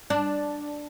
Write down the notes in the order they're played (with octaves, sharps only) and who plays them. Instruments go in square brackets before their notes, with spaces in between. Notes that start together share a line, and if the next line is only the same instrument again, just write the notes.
[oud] D4